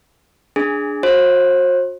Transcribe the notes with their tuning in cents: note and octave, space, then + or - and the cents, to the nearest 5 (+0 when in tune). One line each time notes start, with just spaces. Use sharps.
D4 +0 G#4 +0
F#4 -30 C5 +35